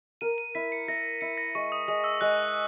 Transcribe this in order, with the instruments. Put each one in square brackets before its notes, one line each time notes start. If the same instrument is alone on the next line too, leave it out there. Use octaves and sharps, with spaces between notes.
[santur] A#4 [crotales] D#7
[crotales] D#7
[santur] E4 [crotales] B6
[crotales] C#7
[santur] E5 [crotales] A#6
[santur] E4 [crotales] C#7
[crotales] A#6
[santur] G#3 [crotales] C#6
[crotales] D#6
[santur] G#3 [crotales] D#6
[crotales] E6
[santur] G#3 [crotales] F#6